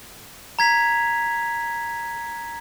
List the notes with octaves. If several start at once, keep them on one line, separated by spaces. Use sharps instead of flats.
A#5 G#6 B6 F7